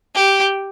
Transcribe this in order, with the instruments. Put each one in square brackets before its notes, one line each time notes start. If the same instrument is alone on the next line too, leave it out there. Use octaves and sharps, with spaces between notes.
[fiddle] G4